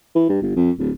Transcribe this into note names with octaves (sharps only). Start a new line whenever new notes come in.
E3
G2
G1
F2
D1